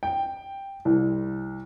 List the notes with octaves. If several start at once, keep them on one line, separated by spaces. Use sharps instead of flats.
G5
C2